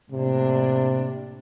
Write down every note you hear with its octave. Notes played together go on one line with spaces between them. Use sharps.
A2 C3 A#3 D4